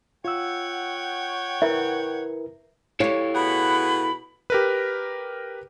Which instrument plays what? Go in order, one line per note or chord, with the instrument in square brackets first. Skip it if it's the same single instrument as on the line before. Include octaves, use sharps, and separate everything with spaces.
[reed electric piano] F4 E6 [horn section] C#5 F#5 G5
[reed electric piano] E4 A#4 B4 [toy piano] E5
[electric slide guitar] E4 A4 F5 [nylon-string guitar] G4 C#5
[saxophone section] B2 G#4 F#5 [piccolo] B5
[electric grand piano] G4 A#4 B4